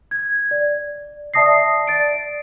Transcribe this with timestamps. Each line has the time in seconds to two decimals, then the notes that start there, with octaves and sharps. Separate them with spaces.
0.11 G#6
0.51 D5
1.34 D5 E5 A5 D#6 A#6 C7
1.87 D5 A6 D7